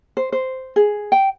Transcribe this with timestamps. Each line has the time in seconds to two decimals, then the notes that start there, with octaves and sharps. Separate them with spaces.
0.17 C5
0.32 C5
0.76 G#4
1.12 G5